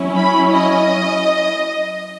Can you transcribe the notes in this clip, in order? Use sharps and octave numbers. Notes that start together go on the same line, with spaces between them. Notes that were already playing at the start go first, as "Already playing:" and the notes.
Already playing: F#3 C#4 E4
B5
D#5